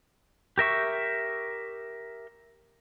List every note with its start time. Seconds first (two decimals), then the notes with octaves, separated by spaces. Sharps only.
0.58 G4 A#4 E5 C#6